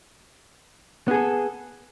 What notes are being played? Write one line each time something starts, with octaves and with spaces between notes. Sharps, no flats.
B3 G#4 A4